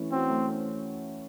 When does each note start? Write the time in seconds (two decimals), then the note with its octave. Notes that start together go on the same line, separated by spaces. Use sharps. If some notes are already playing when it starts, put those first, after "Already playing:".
Already playing: E3 A3 C#4
0.12 C4 F#4
0.30 A3
0.49 C#4